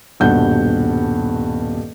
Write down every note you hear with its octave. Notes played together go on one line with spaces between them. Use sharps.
D#1 G2 B2 F#5 G6